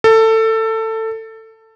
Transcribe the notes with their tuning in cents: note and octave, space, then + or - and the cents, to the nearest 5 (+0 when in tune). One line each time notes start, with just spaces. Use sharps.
A4 +20